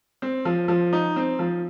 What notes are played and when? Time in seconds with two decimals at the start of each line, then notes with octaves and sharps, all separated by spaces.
0.22 C4
0.45 F3
0.68 F3
0.93 D#4
1.16 C4
1.39 F3